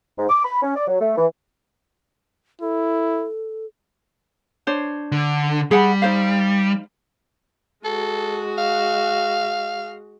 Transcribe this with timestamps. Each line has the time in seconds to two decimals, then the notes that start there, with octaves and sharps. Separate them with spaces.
0.18 G#2
0.29 D6
0.45 B5
0.62 C#4
0.76 D5
0.87 F#3
1.01 A3
1.17 E3
2.61 E4 A4
4.67 D4 C5 C#5
5.12 D3
5.71 G3 G#4 F#5 B5
6.02 D#4 C5 F5
7.85 G#3 F#4 A4
8.58 F5